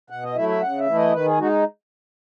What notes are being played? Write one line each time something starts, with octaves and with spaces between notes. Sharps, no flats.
B2 F#5
D#5
F#3 A3 E4 E5
E5
C#3 F#5
E5
E3 A3 E4
D#5
D#3 B4
G#4
G#3 D#4 F#4